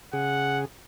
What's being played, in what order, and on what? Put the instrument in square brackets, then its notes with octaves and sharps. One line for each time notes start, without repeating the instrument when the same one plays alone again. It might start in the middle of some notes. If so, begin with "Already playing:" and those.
[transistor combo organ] C#3 G#4 [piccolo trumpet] F#5